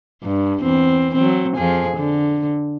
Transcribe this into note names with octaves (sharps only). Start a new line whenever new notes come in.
G2
E2 C4
F#3 C4
F2 F3 G#4
D3